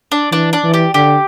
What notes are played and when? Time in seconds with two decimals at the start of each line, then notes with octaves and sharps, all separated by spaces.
0.12 D4
0.32 E3 D4
0.53 D4
0.64 E3
0.74 G4
0.94 D3 G4